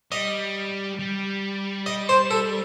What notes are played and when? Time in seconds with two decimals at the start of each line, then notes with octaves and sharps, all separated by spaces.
0.11 G3 D#5
0.99 G3
1.86 D#5
2.09 C5
2.31 A4